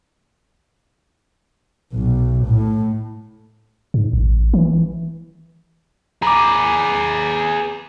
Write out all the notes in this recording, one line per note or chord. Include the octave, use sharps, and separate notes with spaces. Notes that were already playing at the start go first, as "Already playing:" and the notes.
B1
A2
G#2
A1
E3
G#4 B4 A#5 D6